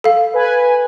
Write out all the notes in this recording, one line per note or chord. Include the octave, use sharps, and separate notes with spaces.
A4 F5
B4 G#5